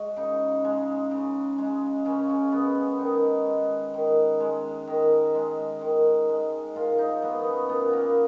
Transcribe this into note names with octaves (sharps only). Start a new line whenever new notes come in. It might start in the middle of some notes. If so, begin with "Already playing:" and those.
Already playing: G#3 F#4
C#3 D#4
G#3
C#3
G#3
C#3 C#4
C#4
G#3 B3
C#4
D#3 D#4
G#3
D#3
G#3
D#3
G#3
D#3
G#3
A#2 F4
D#4
F#3 A#3 B3
B3
C#4
A#2 B3
A#3